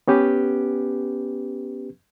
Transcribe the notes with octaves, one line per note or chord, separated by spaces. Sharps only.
B3 C#4 G4 B4